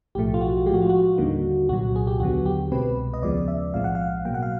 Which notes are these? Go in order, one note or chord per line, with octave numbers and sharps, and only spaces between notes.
B1 A2 F3 A3 G4
F4
F#4
A2 F3 G#3 F#4 G4
F4
F#4
D#2 D3 G3 A#3 D#4
C2 A#2 F#3 F#4
G#4
G4
D#2 D3 F#3 B3 F#4
G4
C2 B2 G#3 C4 B4
D#5
D#2 C#3 F3 G#3 B3 D5
E5
B1 A2 F3 G#3 C4 F5
F#5
F5
B2 F#3 A#3 G5
F#5
F5